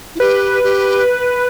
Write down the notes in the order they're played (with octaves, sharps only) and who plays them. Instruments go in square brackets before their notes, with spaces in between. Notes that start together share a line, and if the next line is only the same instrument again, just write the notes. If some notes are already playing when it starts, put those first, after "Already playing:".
[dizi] E4
[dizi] G4 [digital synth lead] B4
[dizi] G4